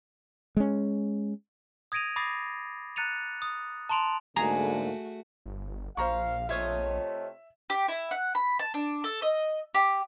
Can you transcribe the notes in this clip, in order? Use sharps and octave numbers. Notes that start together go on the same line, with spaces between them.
G#3 C#4
D#6 G#6 A#6 D7 D#7 F7
B5 D6 D#6 A6 A#6 C7
A#5 F#6 A6 C#7 D#7 F7
D#6
A5 A#5 C6 D7 F7 F#7
G#2 D3 A3 A#3 F#4 G#4 A#5
G1
A#1 C5 F5 A#5 C#6
C3 A3 F4 C#5 D#5 E5
G4
E4
F#5
B5
A5
D4
A4
D#5
G4